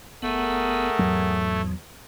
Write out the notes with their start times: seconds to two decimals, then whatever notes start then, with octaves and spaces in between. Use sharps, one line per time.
0.22 F#1 A3 B3 G#4 A#4 F#5
0.99 E2 G#2 F#3